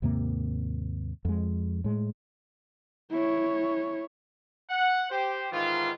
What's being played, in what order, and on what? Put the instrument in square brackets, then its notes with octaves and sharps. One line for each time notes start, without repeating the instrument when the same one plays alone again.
[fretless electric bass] D#2 G#2 C3 A#3
F2 G#3
A2 G#3
[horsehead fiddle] E4 C#5
[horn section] F#5
G4 C5
G#2 D#3 E3 F4